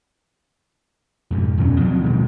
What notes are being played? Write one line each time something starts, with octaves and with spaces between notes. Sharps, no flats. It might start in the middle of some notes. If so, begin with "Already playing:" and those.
F2 G#2 B2
D#2 B2 F#3 C#4
F3 F#3 A#3 C4
B2 D#3 G#3